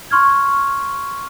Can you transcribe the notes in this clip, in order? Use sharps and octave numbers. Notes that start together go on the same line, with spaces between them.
C6 C#6 F6 G#6